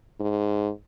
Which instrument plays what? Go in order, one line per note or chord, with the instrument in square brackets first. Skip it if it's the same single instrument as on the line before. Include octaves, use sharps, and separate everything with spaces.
[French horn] G#2